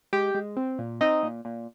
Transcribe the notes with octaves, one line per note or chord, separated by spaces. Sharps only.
G#3 G4 G5
G#3
C4
A#2
C4 D#4 D#5
A#2
A#2